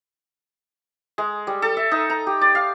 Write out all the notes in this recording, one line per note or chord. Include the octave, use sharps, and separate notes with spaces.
G#3
G3
A4
E5
D#4
A#5
G4
D5
F5